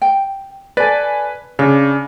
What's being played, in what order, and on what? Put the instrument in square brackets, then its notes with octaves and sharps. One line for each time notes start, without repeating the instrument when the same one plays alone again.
[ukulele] G5
[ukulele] A4 D5 [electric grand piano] B4 G#5
[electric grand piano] C#3 [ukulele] D4